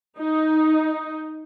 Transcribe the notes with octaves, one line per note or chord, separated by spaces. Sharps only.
D#4